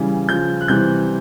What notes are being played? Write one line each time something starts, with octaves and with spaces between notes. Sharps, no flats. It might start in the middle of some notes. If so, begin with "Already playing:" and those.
Already playing: C#3 E3 G3
C#3 F3 G6
F#6
C3 E3 G3 G6